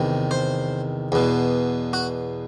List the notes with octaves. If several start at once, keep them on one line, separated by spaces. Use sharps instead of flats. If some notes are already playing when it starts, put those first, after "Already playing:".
Already playing: E2 C3 D#3
C5
E2 B2
F#4